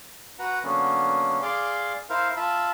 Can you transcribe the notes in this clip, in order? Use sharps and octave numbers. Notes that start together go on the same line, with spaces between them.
F#4 B4 F#5 A#5
D3 F#3 A#3 B3 C#4
G#4 D5 F5 C6 D6
E4 A#4 C5 F5
F4 E5 A5 B5